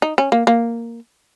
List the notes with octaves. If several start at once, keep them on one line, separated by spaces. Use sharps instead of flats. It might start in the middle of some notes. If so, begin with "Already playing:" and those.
D#4
C#4
A#3
A#3